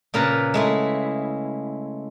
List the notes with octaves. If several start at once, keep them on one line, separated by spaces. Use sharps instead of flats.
A#2 C#3 A#4 B4 A5 A#5
G#3 A3 E4